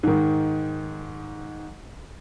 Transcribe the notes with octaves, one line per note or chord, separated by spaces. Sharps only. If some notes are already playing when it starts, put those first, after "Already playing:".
G#2 D#3